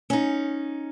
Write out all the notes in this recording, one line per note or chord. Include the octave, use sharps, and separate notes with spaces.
C#4 D#4